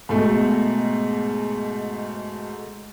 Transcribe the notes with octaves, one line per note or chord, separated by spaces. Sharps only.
G#2 B2 A3